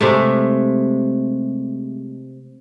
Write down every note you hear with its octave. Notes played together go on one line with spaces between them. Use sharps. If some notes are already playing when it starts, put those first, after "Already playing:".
C3 G#3 A3